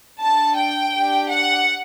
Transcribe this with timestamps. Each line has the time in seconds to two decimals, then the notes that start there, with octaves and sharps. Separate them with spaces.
0.20 D4 A4 A5
0.56 G5
0.93 D4 G4
1.30 F#5